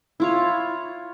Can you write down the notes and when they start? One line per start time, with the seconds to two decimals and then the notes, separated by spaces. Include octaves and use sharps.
0.20 E4 F4 C#5